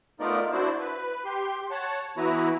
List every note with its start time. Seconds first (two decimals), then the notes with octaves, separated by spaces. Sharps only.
0.20 A3 B3 D#4 F4 A#4 D5
0.52 D4 E4 F#4 C5 D5
0.80 B4
1.25 G4 C6
1.71 C#5 F#5 A5
2.17 E3 B3 E4 F#4 B4 A#5